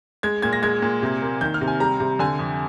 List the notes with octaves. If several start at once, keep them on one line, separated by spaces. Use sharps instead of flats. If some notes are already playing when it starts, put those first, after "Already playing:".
G#3 G#6
A#2 G#6
A#6
G#3 G#6
A#2
C3
A#3
D#3 G6
F6
C3
G#5
G3 A#5
C3
D3 G#5
F2